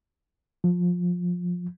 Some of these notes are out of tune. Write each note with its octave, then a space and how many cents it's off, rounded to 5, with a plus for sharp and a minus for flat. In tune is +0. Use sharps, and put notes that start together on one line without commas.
F3 +20